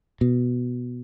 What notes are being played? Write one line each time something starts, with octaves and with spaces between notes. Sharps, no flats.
B2